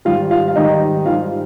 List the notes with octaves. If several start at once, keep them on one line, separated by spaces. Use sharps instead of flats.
G#2 D#3 G3 F4 F5
F4 F5
F5
G#2 D#3 G3 D#4 D#5
G#2 D#3 G3 F4 F5